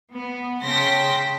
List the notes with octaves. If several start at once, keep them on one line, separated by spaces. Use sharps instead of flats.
B3
C#3 G5 A5 C6 A#6 B6